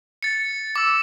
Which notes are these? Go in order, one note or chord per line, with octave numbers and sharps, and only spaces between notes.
A6 C#7
D6 E6